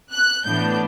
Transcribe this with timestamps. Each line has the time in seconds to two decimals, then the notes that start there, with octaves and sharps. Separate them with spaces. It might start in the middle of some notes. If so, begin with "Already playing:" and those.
0.11 F#6
0.45 A2 E3 B3 D4 G6